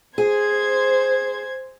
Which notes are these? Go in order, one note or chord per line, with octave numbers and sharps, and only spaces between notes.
G#4 C5 G#6